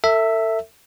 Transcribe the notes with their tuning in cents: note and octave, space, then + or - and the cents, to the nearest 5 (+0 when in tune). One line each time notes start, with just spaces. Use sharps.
A4 +35 E5 +0